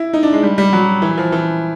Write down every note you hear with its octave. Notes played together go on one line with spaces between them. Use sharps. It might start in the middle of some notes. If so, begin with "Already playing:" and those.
Already playing: E4
D#4
D4
G#3
G3
G3
F#3
E3
F3
E3